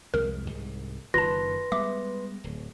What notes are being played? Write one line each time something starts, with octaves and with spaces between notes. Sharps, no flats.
C2 F2 G#3 A#4
C2 G#2
F#1 F#2 D#3 F4 B4 A5 C6 A#6
G3 G#3 B3 E5 D6
D1